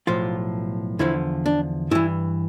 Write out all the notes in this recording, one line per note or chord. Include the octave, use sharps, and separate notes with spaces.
B1 A2 F3 F4
E2 D3 F3 E4
D4
G2 E3 E4